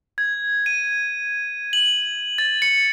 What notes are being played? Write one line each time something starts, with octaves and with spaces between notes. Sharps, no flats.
G#6
D#7
F#7
A6
C#7